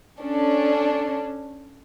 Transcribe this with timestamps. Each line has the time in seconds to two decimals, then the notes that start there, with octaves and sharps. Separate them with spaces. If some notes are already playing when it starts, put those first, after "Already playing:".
0.20 C#4 D4 A4